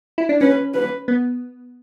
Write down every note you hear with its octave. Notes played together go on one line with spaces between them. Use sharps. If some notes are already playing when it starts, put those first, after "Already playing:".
E4
D4
C#4 B4
B4
B3